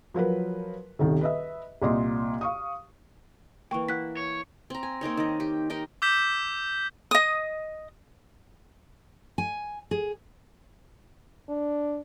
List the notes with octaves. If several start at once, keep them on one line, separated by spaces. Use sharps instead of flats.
F3 F#3 A#4 B4
D#1 C2 D#3
B4 D#5 E5
C2 A#2 D5 D#5 C6
F5 C#6 D#6
E3 A#3 G5 C#6
E4 F#5 F#6 B6
C#5
C4 A#5
G#5
A#3 C4 D#4 C#5
D#3 D#5
G4
D#4 G4 A#4 D#5
D6 E6 G6 B6 E7
D#5 D#6
G#5
G#4
D4